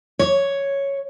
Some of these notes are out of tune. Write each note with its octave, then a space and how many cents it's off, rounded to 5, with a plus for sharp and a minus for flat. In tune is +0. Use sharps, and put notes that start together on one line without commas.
C#5 +0